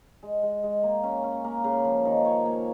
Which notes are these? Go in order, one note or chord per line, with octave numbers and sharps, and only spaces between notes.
G#3
G#3
G#3
A#3
C#4
C#4
A#3
C#3
F3
D#3
C#5
A#3